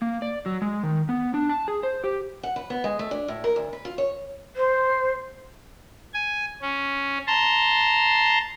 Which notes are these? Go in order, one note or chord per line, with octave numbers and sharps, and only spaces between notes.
A#3
D5
F#3
G#3
D#3
B3
D4
A5
G#4
C5
G4
F#5
B4
B3
G#3
A3
D4
A2
A#4
D2
B4
F4
C#5
C5
G#5
C#4
A5 A#5 C6